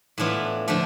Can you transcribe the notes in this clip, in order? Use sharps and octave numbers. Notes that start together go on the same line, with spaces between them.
A2 E3 B3 D4 F4
D3 F3 A3 D4